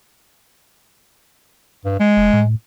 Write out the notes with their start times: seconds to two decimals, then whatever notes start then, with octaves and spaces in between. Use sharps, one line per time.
1.85 G2
2.00 G#3
2.17 F1
2.33 A2